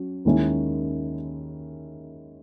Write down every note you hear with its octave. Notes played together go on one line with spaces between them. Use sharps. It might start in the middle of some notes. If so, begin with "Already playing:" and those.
Already playing: F#3 C#4 F#4
D#2 D#3 G#3 C#4 E4